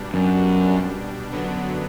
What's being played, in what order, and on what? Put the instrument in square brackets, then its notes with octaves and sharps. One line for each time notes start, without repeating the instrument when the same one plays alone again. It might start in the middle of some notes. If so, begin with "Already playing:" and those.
Already playing: [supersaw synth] B2 G3 D4
[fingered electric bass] F#2
[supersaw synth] F#2 D3 F#3 B3 D4